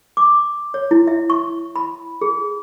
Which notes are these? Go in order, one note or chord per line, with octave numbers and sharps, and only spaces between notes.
D6
C#5
E4
E5
C#6
B5
G#4